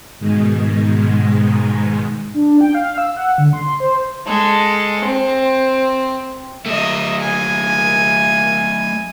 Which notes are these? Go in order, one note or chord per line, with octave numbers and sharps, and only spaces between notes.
G#2 B2 D#3 G#3
D4
G5
F5
E6
F#5
D3
C6
C5
G#3 A4
C4
F#3 A3 D#5 E5
G#5